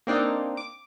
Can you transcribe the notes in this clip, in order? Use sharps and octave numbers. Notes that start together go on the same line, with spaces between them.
A#3 C4 D4 D#4
D6